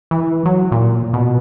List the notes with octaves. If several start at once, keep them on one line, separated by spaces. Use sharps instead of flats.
E3
F#3
A#2
B2